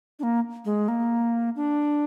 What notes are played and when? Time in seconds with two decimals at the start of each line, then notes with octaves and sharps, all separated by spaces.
0.19 D4
0.23 A#3
0.65 G#3
0.88 A#3
1.56 D4